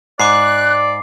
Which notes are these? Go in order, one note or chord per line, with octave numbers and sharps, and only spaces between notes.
G#2 D5 D6 F#6 C7